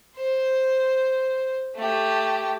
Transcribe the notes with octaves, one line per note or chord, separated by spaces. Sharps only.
C5
A3 G4